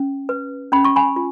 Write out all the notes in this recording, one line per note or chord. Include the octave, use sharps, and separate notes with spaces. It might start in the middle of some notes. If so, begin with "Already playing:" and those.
Already playing: C#4
B4
C#4 B5
C#6
G#5 B5
F4